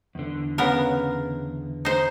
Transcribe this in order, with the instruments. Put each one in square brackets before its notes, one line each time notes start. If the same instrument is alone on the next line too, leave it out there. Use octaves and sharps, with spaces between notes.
[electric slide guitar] E2 D3
[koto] C#3 B3 A#4
D#4 C5